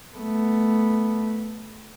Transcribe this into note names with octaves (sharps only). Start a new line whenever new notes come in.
A3 B3